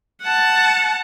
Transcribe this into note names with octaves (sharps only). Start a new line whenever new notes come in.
F#5 A5